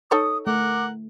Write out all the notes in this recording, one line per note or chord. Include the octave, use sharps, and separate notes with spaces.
D#4 A4 C#5 D#6
A3 A#4 F#5 D6